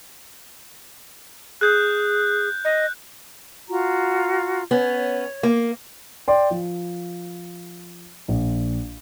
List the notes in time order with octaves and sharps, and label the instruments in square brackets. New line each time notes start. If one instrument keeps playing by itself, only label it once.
[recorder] G#4 [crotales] F#6 G6
[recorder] D#5
[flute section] F4 F#4 A#5
[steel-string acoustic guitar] B3 C#4 [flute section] C#5
[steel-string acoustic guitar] A#3
[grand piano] D5 G5 C6
F3
A#1